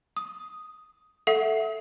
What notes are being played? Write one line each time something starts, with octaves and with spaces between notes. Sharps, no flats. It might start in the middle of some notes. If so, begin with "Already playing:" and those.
D#6
A4 E5 F#5 C7